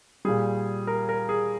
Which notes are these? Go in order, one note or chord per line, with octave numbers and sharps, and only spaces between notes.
A#2 G3 G#4
A#4
A#4
G#4